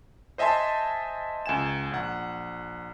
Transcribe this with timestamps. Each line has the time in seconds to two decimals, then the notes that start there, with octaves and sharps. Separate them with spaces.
0.38 C5 D#5 E5 G#5 A5 C6
1.46 C#2 G#5 E7
1.91 A#1 F#5